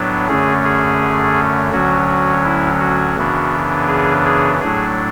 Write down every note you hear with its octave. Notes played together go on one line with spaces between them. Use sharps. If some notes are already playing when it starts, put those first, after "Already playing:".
Already playing: A2 F#3 B3 D4
F#2 D3 A3 C#4 G#4
G#4
D2 D3 F#3 C#4 F#4
F#4
E4
F#4
F#2 C#3 E3 B3 D4
G#4
G#4
A2 F#3 A3 D4 G#4